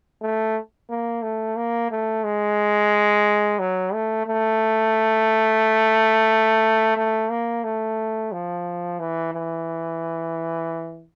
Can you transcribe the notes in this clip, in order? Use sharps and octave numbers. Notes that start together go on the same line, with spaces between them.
A3
A#3
A3
A#3
A3
G#3
F#3
A3
A3
A3
A#3
A3
F3
E3
E3